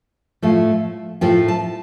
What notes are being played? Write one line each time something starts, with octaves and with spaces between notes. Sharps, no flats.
A2 F3 A3
A2 F3 A3 G5
A5